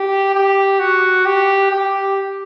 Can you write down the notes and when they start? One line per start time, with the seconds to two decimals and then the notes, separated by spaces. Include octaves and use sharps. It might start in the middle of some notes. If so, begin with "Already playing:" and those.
Already playing: G4
0.35 G4
0.80 F#4
1.25 G4
1.71 G4